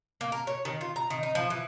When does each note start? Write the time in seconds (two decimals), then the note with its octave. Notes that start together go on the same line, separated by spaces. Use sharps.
0.21 A#3
0.32 A#4
0.47 C#5
0.65 D#3
0.81 F4
0.96 A#5
1.10 D#3
1.23 D#4
1.35 F3
1.50 E3